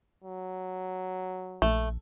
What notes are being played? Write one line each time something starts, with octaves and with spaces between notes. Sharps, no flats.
F#3
A#1 A3